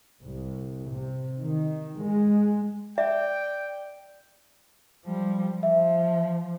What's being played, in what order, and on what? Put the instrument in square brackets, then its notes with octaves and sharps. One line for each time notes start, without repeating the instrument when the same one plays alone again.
[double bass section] C2
C3
D#3
G#3
[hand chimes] D5 [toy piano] E5 [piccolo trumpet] G5
[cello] F3 G3
[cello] F3 [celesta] E5